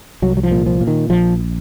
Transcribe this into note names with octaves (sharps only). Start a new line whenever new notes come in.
C2 F#3
F#3
F3
A#2
F3
A#2
D#3
A#1 F3